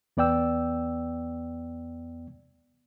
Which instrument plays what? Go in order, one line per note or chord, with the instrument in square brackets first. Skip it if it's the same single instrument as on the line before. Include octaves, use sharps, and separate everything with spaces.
[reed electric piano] E2 B3 D5 G5 E6